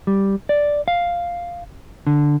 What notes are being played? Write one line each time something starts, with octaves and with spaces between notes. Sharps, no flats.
G3
D5
F5
D3